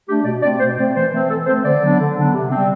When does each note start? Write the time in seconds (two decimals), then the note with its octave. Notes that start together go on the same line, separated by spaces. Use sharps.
0.08 A3 D4 G4
0.25 B2 D5
0.42 A3 C4 D5
0.60 B2 C5
0.77 A3 C4 D5
0.95 E3 C5
1.12 A3 C4
1.29 E3 A4
1.46 A3 C4 C5
1.64 D3 D5
1.82 F#3 B3 D4
1.99 D3
2.17 F#3 B3 D4
2.34 C3
2.51 G3 C4